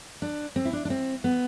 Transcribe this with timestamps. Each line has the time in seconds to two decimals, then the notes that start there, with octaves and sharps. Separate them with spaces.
0.22 D4
0.56 C4
0.65 E4
0.73 D4
0.85 D4
0.90 C4
1.24 B3